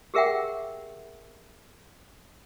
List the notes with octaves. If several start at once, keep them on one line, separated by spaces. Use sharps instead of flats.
G4 G#4 A#4 E5 F#5 G5